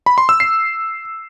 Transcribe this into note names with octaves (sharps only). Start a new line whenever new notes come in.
B5
C6
E6
C7